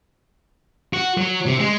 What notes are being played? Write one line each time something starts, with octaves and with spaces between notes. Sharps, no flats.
F#4
F#3
C3
G#3